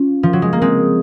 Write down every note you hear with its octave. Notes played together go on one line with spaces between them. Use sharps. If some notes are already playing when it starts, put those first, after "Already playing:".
Already playing: C#4 F4
F3
F#3
G#3
A#3
G#3 C4